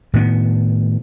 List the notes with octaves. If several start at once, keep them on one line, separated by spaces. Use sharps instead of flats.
A2 D#3 B3